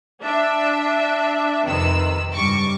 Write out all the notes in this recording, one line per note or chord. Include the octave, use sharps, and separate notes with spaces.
D4 E5
F2 C3 D#3 B4 E6
C#2 G2 G3 C#6 D6